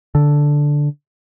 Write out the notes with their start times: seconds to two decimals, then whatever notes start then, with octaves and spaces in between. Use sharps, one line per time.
0.15 D3